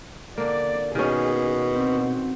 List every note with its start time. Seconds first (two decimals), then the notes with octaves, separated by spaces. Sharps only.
0.38 D3 A#3 D5
0.95 B2 D#3 C#4 G#4
1.72 C4 F#4